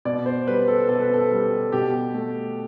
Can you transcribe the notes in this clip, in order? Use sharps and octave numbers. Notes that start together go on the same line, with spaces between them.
B2 D5
C5
G3 B4
A4
B2 A4
B4
A4
G3
B2 G4
A3